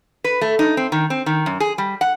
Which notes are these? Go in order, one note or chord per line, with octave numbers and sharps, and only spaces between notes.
B4
A3
D#4
C4
D#3
C4
D#3
F#2
G#4
G3
F#5